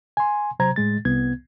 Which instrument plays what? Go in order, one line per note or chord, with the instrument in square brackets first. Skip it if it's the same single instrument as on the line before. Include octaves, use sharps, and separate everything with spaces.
[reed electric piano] G#5 C6
C3 F#3 C5 A#5 G#6
A2 G#3 A6
C2 B3 G#6